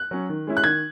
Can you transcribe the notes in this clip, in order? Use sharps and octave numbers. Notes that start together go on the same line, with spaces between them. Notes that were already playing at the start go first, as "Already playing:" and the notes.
Already playing: F#6
F#3 C#4
D#3
G#3 C#4 E4
F#6
D#3 G#6